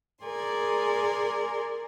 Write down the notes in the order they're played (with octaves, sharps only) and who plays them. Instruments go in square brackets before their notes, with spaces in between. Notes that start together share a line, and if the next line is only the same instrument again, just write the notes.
[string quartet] G#4 A#4 D5 G#5 C6